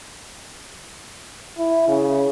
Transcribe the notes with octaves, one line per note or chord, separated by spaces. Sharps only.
E4
C#3